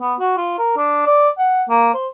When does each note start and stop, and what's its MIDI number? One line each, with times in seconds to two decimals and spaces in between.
0.01 0.14 59
0.19 0.33 66
0.37 0.54 65
0.58 0.74 70
0.77 1.03 62
1.06 1.29 74
1.38 1.64 78
1.69 1.93 58
1.94 2.07 72